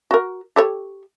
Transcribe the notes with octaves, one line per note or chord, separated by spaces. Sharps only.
F#4 A#4
G4 A4 C#5